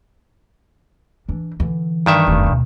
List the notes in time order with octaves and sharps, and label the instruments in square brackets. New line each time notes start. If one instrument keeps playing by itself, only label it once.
[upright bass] E3 D4
D3 E3
[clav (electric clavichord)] G2 D#3 E5
[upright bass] F1 F#2
D2 B2